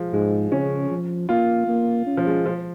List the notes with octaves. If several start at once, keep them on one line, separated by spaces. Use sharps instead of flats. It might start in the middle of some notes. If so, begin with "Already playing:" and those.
Already playing: F3 G#3
G#2 G#3
C#3 C#4
F3
A#3 F4
A#3
C#4
F3
G#3
F3